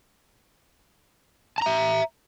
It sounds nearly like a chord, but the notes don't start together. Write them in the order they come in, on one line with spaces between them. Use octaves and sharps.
A5 A#5 E5